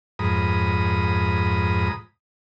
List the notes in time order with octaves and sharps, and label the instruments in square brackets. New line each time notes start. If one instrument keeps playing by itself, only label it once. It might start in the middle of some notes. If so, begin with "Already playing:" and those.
[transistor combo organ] F2 G#2 A#5 B5 D#6